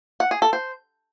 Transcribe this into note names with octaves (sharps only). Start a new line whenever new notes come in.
F#5
G#4
A4
C5